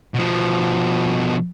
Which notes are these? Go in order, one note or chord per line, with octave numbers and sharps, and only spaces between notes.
B2 F3